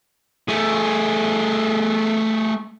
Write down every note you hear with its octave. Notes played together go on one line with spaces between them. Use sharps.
A3 G#4